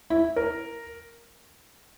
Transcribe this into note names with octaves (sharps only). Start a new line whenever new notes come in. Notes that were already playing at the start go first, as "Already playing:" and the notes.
E4
A#4